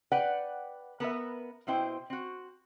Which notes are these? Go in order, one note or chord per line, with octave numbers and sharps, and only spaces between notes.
B4 D5 F#5 G5
B3 A#4 B4 E5
B2 C4 E4 C5 G5
C4 F#4